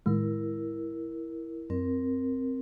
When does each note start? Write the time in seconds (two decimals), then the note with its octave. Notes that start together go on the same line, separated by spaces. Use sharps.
0.06 A2 D#3 G#3 E4 A#4
1.70 F#2 C4 A#4